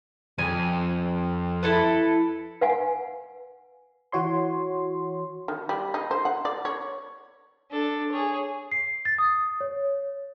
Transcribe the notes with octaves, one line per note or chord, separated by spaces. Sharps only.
F2 G#5
E4 A4 B4
B4 F5 F#5 G#5
E3 F#4 C#5 C6
D#3
G3
D#4
C5
F#5
D5
C#5
D4 A4
G#4 C#5
C7
A6
D#6
C#5